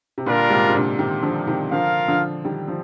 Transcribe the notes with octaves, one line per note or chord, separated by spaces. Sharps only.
C3
A#2 D3 G3 D4 F4 A#4
G#2 C3
C3
A#2 D3
C3 D#3
D3 F3
C3 D#3
D3 F3 F4 A#4 F5
D3 F3
D#3 G3
F3